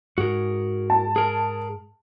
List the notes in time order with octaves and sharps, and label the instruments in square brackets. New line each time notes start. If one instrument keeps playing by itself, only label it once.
[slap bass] G#2 [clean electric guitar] F#4 G#4 A#4
[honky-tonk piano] A5
[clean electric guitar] G#4 A#4